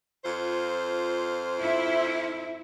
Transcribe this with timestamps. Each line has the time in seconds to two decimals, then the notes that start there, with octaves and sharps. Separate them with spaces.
0.25 F2 F4 C5
1.61 E4